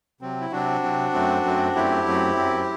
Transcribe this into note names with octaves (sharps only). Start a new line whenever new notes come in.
C3 F#3 C4
E4
C3 F#3 C4 D4 F#4
C3 F#3 C4
F#2 F#3 A3 C4
F#2 F#3 A3 C4
F#2 F#3 A3 C4 E4 G4
F#2 F#3 A3 C4
F#2 F#3 C4